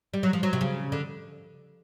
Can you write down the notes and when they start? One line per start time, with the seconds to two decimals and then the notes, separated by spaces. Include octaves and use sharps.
0.14 G3
0.23 F#3
0.33 F3
0.43 F#3
0.53 C3
0.61 C#3
0.92 D3